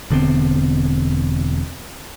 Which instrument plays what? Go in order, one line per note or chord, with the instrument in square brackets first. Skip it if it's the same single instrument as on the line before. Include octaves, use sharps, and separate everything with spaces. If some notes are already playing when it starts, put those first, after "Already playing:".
[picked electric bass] E1 D3 B3 C4